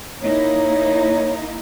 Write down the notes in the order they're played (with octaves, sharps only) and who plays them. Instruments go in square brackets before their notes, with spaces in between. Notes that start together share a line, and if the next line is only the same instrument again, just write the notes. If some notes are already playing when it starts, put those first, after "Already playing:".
[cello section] A#3 D#4 E4 [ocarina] C#5